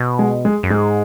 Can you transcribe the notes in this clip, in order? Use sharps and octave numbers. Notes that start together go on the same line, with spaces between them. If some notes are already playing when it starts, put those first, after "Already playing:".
Already playing: B2
G#3
G#3
F#2
G#2 G#3